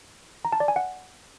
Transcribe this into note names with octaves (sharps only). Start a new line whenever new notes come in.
A#5
A5
D5
G#5
F#5